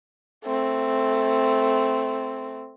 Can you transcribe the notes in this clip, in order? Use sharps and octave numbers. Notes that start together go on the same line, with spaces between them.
A3 C4